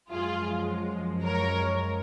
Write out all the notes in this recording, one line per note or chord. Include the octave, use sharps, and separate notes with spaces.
F#2 F3 G#3 F4 G#4
A#4 C#5